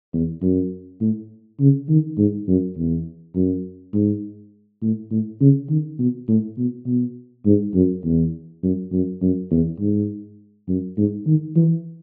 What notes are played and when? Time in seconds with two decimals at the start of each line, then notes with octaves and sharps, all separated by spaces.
0.14 E2
0.42 F#2
1.01 A2
1.60 C#3
1.89 D#3
2.18 G#2
2.48 F#2
2.77 E2
3.35 F#2
3.94 G#2
4.82 A2
5.11 A2
5.41 C#3
5.70 D#3
5.99 B2
6.28 A2
6.58 B2
6.87 B2
7.46 G#2
7.74 F#2
8.05 E2
8.63 F#2
8.92 F#2
9.22 F#2
9.51 E2
9.80 G#2
10.69 F#2
10.97 G#2
11.26 D#3
11.56 E3